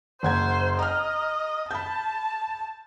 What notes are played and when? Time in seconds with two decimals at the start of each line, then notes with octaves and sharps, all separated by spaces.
0.23 F#1 C5 F#5 G#6
0.79 D#5 A#5 F6
1.71 A5 B5 G6